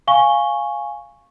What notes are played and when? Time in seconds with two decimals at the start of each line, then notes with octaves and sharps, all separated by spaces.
0.08 F5 G#5 C#6 G7